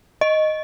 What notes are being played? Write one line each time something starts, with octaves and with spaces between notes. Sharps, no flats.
D#5